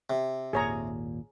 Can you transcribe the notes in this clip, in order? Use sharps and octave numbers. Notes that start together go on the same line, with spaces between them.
C3
G#1 D#2 A#2 G#4 C#5 A#5